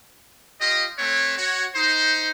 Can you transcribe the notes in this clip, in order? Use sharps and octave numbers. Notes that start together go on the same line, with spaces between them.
F4 G4 D#5
A3 C4 B4 C#5
F#4 C#5
D#4 C5